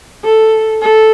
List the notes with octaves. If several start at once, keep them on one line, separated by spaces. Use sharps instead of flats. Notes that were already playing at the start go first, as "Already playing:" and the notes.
A4
A4